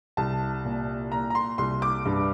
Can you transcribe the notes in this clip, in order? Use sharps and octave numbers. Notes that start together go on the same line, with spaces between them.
C2 A5
A#2
A#2 A#5
A#5
C6
C2 C6
D6
G2